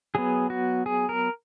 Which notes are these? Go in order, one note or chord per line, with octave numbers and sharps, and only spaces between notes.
F#3 B3 G#4
F#4
G#4
A#4